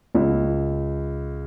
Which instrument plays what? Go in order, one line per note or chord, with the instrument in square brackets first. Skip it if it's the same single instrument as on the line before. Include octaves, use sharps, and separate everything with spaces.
[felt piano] C#2